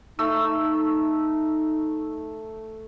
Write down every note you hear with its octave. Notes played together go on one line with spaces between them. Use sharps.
A3 D#4 E6